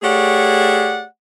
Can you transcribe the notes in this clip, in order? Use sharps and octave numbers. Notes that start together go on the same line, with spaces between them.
A3 G4 G#4 C#5 D5 F#5